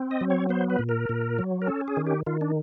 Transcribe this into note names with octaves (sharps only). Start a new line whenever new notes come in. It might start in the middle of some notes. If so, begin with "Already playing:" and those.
Already playing: C4
D#5
F#3
C#5
B3 C5
B4
A#2
A#4
A#2
F#3
A#4
C#4 A4
G#4
D#3
G4
D#3 F4
D4